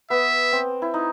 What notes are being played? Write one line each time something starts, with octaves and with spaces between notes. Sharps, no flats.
B3 E5
C4
E4
D#4